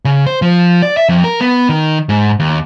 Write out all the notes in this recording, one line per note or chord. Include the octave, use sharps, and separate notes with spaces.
C#3
C5
F3
D5
E5
F2
A#4
B3
D#3
G#2
D#2